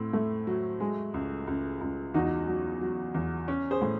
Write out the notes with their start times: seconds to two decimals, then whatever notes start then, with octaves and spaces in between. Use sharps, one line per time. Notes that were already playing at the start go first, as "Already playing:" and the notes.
Already playing: A2 C4
0.13 A3
0.47 F#3
0.80 G#3
1.14 C#2
1.47 C#2
1.81 C#2
2.14 E2 D#4 F#4
2.48 F#3
2.81 F#3
3.14 E2
3.48 C#4
3.71 G#4 C5
3.82 A2